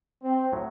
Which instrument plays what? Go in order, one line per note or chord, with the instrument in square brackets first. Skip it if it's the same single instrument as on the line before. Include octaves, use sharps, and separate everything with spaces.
[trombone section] C4
[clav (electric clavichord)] A2 F#3